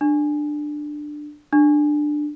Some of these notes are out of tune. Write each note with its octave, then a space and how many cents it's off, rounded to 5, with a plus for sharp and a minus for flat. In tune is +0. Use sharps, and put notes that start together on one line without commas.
D4 +15
D4 +15